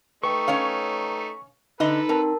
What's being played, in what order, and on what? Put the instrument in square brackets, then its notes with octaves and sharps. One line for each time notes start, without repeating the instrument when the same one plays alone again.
[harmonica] A3 D#4 [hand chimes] B4 G5 [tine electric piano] C#6
[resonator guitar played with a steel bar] C#4 C#5 F5
[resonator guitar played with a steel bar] D3 D#5 [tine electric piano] D#4 [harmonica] A4 B4 [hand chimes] F#6
[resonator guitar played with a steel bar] C4 [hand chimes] A#4 A5